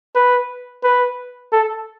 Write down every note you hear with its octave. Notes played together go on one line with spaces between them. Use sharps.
B4
B4
A4